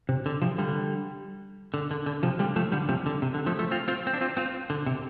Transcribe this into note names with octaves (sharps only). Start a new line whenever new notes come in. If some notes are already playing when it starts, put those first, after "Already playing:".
C3
D3
C3 F3
D3 G3
D3
D3
D3
C3 F3
D3 G3
F3 A3
D3 G3
C3 F3
D3
C3
D3
F3 A3
F3 A3
C4 F4
C4 F4
C4
D4
C4 F4
C4 F4
D3
C3